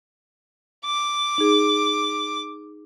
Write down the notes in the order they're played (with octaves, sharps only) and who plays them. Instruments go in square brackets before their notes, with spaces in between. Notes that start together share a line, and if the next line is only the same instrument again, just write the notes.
[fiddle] D6
[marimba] D#4 G#4